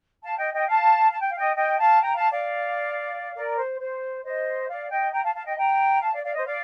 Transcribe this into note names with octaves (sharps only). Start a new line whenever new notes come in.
F5 A5
D#5 G5
D#5 G5
F5 A5
A5
G5
F5
D#5 G5
D#5 G5
F5 A5
G5 A#5
F5 A5
D5 F5
A#4 D5
C5
C5
C5 D#5
D5 F5
D#5 G5
G5 A#5
F5 A5
F5 A5
D#5 G5
G5 A#5
F5 A5
D5 F5
D5 F5
C5 D#5
D5 F5